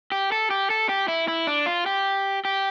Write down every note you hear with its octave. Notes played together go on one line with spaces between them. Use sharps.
G4
A4
G4
A4
G4
E4
E4
D4
F4
G4
G4